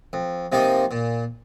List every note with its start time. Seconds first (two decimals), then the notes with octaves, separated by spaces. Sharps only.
0.13 F2
0.52 C3 F3 A#3 D#4
0.91 A#2